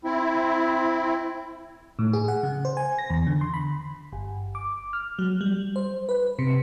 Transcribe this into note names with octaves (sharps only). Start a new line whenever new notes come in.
C4 E4
A2
G#4
F#5
C#3
C5
G#5
A#6
E2
D3
C6
B5
G1
D6
F6
F#3
G3
C5
B4
C3